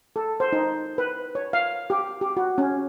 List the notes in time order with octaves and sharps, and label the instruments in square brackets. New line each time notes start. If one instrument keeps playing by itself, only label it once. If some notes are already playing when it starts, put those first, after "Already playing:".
[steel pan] A4
C5
D#4
B4
C#5
F5
G4
G4
F#4
C#4